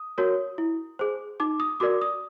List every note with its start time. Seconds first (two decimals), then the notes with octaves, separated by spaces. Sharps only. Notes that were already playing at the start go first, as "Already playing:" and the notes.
Already playing: D#6
0.18 F#4 A#4 C#5
0.58 E4
0.99 G#4 C5
1.40 D#4 D6
1.60 D#6
1.80 F#4 A#4 D5 D6
2.01 D#6